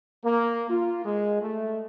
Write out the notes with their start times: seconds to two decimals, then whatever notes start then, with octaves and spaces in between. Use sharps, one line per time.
0.25 A#3
0.70 F4
1.05 G#3
1.42 A3